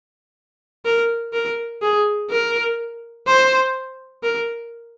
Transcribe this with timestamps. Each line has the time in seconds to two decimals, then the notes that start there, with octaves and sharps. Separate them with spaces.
0.85 A#4
1.33 A#4
1.82 G#4
2.30 A#4
3.27 C5
4.23 A#4